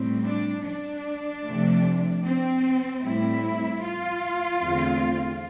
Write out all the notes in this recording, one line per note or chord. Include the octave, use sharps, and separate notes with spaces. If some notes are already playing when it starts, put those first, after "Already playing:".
Already playing: A2 G3 C4
D4
D4
C3 F3 A3
C4
A2 G3 C4 E4
F4
E2 D3 A3 C4